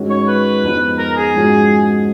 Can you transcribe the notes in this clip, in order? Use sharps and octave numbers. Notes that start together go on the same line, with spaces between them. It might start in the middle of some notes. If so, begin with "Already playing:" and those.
Already playing: G#2 D#3 G#3 C#4 F#4
C#5
B4
F2 F3 G#3 B3 D#4
A#4
G#4
G#2 F3 G#3 C#4 F#4